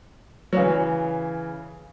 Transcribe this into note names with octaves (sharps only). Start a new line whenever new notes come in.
F#3
C#3 E3